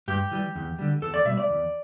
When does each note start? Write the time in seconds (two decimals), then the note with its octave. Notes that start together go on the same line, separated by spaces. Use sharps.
0.08 G2 G4
0.31 E3 G3
0.56 E2
0.79 D3 G3
1.02 E2 A4
1.14 D5
1.25 B2 G3 E5
1.38 D5
1.49 E2